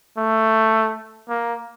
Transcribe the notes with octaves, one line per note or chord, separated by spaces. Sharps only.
A3
A#3